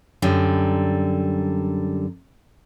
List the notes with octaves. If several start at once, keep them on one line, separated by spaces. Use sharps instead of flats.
F#2 D3 G3